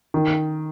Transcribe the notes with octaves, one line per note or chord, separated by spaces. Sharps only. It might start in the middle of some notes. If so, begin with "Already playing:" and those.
D#3